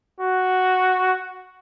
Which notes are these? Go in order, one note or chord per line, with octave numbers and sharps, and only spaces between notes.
F#4